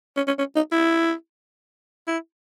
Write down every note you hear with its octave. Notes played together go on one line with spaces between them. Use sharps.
C#4
C#4
C#4
D#4
E4
E4